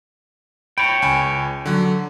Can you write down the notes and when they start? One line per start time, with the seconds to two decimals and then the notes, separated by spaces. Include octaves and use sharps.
0.78 C#5 G5 B5
1.02 C#2 G#5 B5
1.66 D3 F#3